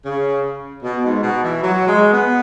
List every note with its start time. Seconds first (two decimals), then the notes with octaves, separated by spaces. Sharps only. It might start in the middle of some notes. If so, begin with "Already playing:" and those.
0.05 C#3
0.83 B2
1.03 G#2
1.22 B2
1.42 E3
1.62 F#3
1.87 G#3
2.13 B3